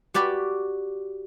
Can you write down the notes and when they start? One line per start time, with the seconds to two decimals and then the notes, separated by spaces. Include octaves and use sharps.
0.14 F#4 G4 D5 B5